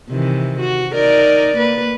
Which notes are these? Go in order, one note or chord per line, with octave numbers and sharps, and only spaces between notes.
C3 D#3 E3
F#4
D#4 A#4 D5
A#3 B4